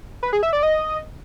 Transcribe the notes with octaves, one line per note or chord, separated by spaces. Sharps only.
B4
G#4
E5
D5
D#5